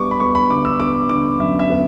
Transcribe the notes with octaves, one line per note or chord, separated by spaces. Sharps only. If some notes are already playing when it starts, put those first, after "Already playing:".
Already playing: G3 B3 C#6 D6
B5
B3 C#6
B5
D3 D6
E6
B3 D6
D3 D6
F#2 E5
E5
B3